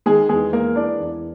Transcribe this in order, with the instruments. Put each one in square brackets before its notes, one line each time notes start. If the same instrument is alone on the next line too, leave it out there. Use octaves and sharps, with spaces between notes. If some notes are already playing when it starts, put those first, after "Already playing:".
[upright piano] D#3 G#3 G#4
E2 G#3 G#4
G#3 A#3 A#4
E3 D4 D5
E2